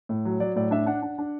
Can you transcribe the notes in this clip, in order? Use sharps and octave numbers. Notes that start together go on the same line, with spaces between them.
A2
F#3
F#3 D5
A2 D5
D4 E5
D4 F#5
D4
D4